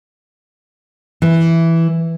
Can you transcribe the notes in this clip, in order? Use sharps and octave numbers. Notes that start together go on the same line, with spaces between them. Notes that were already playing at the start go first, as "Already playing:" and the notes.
E3